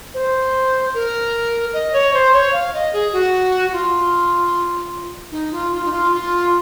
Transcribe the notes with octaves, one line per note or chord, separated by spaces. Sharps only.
C5
A#4
D#5
C#5
C5
C#5
F5
D#5
G#4
F#4
F4
D#4
F4
F4
D#4
F4
F4